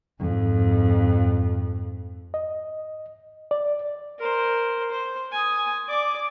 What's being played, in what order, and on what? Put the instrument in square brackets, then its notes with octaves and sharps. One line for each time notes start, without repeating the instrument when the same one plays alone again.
[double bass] F2 G#2
[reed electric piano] D#5
D5
[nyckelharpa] A#4 C5
C5
G#5 D#6
D5 D6